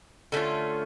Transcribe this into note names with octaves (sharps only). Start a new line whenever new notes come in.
D3 A3 C#4 F4